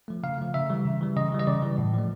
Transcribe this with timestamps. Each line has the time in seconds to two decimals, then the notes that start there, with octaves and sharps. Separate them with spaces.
0.08 F3 A3
0.23 C#3 F5
0.38 F3 A3
0.54 C#3 E5
0.70 E3 G3
0.85 C#3
1.01 E3 G3
1.16 C#3 D#5
1.32 E3 G3
1.39 D#5
1.47 C#3 D5
1.63 E3 G3
1.78 A2
1.94 F3 A3